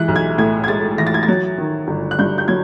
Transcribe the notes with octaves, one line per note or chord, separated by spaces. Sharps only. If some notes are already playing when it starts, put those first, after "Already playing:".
Already playing: E3 G#3 F#6
B1
G#6
A2 G#6
G#6
G#3 A6
E3 A#6
A6
G#6
A6
F#3
D#3
G1
F#6
G2 G6
G6
F#3 G#6